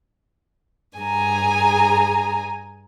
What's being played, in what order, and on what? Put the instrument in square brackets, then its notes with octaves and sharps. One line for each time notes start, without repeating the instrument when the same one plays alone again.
[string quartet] G2 G#4 G#5 A#5